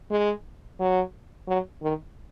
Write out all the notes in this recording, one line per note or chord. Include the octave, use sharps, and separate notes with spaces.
G#3
F#3
F#3
D#3